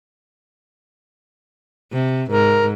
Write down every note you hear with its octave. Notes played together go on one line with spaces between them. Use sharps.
C3
G#2 A#4